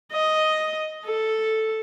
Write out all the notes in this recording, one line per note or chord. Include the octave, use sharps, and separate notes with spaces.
D#5
A4